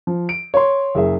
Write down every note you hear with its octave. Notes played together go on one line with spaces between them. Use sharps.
F3
D7
C#5 C6
F#1 G#4 E5